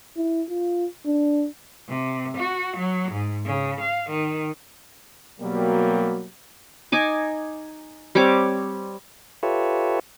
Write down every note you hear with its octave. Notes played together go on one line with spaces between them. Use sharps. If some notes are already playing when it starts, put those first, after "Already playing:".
E4
F4
D4
C3
F#4
F#3
G#2
C#3
F5
D#3
B2 F#3 G3 A#3
D#4 G#5 D6
G3 C4 C#5 D6
F4 G4 A4 B4 C#5 E5